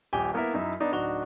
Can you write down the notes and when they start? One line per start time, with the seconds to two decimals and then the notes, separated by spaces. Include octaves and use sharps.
0.13 D#1 A#1 G4 G#5 G7
0.34 A#3 B3 E4 A#4 E5
0.54 F#2 D#4 E4 E5
0.80 B3 D4 D#4
0.92 D1 D4 D#4 F#4 F7 G7